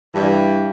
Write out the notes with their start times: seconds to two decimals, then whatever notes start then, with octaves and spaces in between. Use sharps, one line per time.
0.15 G2 E3 G3